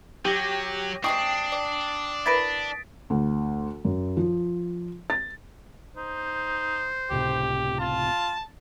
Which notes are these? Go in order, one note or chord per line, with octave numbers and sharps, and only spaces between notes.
F#3 G4 A#6 D#7
C3 G#3 D4 G5 C#6 D#6 C7
D5
E4 A#4 B4 A6 B6 D7
D2
F#2
F3
A6
D#4 C5
C#2 A2 C3 G4
F4 A5